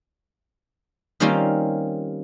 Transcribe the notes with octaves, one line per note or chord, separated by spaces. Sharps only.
D#3 G3 A#3 C4 C#4 F4